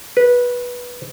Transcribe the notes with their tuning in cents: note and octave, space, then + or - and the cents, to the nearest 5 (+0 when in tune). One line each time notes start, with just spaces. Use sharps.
B4 -15